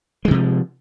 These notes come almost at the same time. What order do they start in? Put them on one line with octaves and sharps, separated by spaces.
G#3 D#3 C3 F3